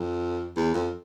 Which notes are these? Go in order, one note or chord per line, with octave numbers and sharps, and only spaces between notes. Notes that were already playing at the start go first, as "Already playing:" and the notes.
Already playing: F2
E2
F2